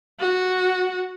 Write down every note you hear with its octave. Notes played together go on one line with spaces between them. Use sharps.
F#4